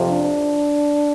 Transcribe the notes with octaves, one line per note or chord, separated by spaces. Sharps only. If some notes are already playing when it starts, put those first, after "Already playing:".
Already playing: F2 C3 F3
D4